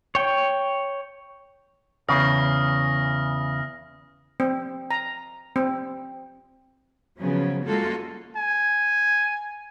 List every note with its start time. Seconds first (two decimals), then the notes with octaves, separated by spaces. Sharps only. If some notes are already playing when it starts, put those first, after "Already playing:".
0.15 C#5 G5
2.09 E2 C#3 D#6 F6 A#6
4.40 C4
4.91 A#5
5.56 C4
7.20 C#3 F3 F#3 B3 C#4
7.64 G3 G#3 A#3 F4 F#4 A4
8.36 G#5